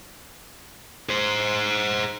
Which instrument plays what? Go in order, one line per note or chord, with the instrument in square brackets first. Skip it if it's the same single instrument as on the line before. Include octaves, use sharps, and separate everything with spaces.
[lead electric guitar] G#4 C5